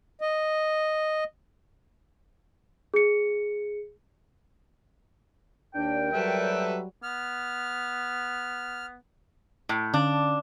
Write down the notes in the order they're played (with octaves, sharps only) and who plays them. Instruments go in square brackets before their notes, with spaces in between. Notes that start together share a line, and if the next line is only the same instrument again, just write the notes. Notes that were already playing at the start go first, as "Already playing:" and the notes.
[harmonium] D#5
[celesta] G#4 C#7
[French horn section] D#2 D4 [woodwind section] A#4 G5
[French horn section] F#3 G3 [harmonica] A4 B4 E5
[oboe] B3 [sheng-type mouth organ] F6
[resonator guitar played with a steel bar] A2
[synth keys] D3 C#4 F5 [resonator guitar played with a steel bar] D4